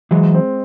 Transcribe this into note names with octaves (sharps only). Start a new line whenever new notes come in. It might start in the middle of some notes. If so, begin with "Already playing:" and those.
E3 F#3 G#3
C4